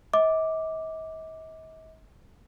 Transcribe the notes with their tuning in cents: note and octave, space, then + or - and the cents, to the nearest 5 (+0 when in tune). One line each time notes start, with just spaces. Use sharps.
D#5 +45 D6 +0